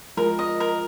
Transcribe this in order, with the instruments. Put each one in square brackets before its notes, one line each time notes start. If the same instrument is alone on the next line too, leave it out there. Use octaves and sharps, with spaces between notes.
[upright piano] F3 G#3 [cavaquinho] A#4
[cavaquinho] D#5
A#4